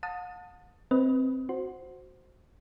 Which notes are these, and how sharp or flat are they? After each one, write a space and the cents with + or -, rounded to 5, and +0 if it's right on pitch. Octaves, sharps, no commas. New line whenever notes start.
F#5 -45 A5 +20 D#6 +0
C4 +0 B4 +0 D#5 +25
F#4 +0 C5 +0